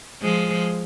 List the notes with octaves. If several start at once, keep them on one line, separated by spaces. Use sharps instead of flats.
F3 G#3